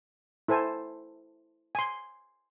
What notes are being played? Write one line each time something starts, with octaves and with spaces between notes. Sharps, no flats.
E4 A4 C5 G#5
G#5 C6